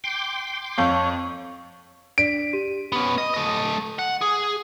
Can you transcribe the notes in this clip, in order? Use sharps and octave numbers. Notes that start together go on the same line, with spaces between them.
G5 C6 D6
F2 C#5 F5 G6
D4 D5 B6 D7
G4 D#7
B3 C#4
D#5
A3 D#5
F#5
G#4